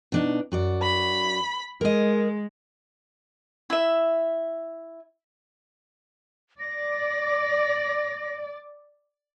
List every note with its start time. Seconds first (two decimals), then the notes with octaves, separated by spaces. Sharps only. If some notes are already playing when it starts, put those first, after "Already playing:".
0.12 B2 D4 D#4
0.52 F#2 F#4 D5
0.81 B5
1.81 G#3 A#4 D#5
3.70 E4 E5
6.60 D5 A#6